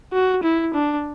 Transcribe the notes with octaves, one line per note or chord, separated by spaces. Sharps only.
F#4
E4
D4